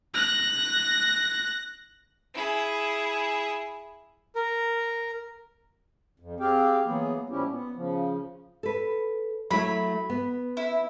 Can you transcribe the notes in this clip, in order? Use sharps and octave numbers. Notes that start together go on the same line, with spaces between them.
F#6 A#6
E4 G#4
A#4
F2
C4 G4 G#4 F5 G5
E3 F#3 A#3 B3 G#4
A#2 F3 G3 C#4 E4 G4
B3
C#3 F3
A4 B4
F#3 A3 E4 B5
B3
E4